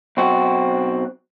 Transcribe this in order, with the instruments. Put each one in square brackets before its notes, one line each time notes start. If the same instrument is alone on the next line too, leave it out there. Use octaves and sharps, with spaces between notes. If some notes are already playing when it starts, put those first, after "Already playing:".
[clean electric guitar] B1 C4 F#4